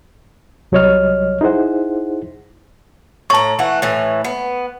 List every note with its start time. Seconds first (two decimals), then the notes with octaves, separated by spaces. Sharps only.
0.72 C2 F#3 G3 C#5 D#5 F6
1.41 D#4 E4 G#4 C5 F#5
3.30 A2 A5 A#5 C#6
3.59 E3 A3 F#5
3.82 A2 E3
4.24 B3